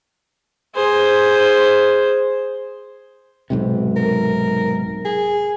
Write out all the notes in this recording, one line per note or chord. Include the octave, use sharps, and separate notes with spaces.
G#4 C5
B1 G#2 C3
A#4
G#4